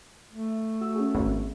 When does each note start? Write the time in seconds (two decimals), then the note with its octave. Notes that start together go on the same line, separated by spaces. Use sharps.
0.29 A3
0.81 F#4 E6
0.95 C#4 F#4 G#4
1.15 G#1